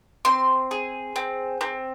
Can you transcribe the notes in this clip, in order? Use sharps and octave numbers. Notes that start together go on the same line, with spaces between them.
C4 C6
G#4
C4
C4